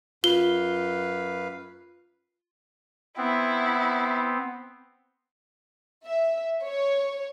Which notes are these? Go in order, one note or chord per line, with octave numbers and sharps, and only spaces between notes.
F#2 F4 B4 F5 G7
B3 C4 E4
E5
C#5